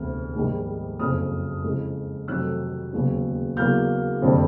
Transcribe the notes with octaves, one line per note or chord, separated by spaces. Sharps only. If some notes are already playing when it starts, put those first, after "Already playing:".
Already playing: E1 D2 C3 F6
A#1 G#2 D#3 G3
F#1 F2 C#3 F#3 D#6 F6
F2 C#3 E3 G#3
F2 C3 D#3 F#3 A3 E6 F#6
E1 D#2 C#3 F#3
E2 C#3 F#3 A#3 F6 G6
F#1 F2 D3 G3 C4